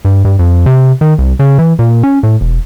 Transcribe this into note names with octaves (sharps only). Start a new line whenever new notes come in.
G2
G2
F2
C3
D#3
C2
C#3
E3
A#2
C#4
A2
E1